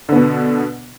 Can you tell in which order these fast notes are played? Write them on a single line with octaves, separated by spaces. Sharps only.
D3 B3 B2